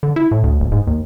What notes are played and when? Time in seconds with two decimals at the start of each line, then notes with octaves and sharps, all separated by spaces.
0.03 D3
0.16 E4
0.31 A2
0.44 D2
0.60 D1
0.72 G#2
0.87 D#2